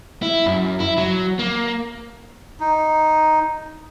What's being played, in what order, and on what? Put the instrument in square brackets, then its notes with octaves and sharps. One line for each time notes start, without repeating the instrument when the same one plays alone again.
[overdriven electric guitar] E4
F#2
E4
F#3
A#3
[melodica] D#4